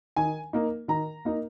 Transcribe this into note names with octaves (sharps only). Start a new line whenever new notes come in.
D#3 G#5
A#3 D#4
D#3 A#5
A#3 D#4